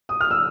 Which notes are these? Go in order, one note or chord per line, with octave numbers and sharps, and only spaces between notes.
D#6
F6
E6